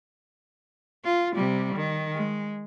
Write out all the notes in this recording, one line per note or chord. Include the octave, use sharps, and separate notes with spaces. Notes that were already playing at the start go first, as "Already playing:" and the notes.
F4
C3 G3
D#3
G#3